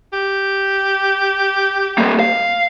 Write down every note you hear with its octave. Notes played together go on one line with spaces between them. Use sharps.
G4
G3 A#3
F5